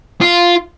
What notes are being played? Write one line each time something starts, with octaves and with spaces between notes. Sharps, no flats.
F4